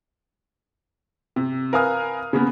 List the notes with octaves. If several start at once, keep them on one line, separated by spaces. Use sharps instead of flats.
C3
A#4 B4 F5 G#5 D#6 F6
C#3 A#3 B3